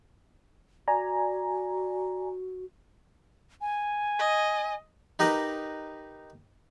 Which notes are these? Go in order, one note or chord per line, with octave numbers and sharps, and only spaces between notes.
F#4 D5 G#5 A#5
G#5
D#5
D#4 G4 A#4 B4 D#5